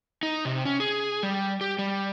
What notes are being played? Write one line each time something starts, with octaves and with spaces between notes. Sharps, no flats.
D#4
C3
C#4
G#4
G3
G4
G3